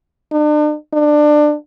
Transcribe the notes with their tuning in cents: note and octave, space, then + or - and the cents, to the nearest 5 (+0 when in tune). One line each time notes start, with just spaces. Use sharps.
D4 +40
D4 +20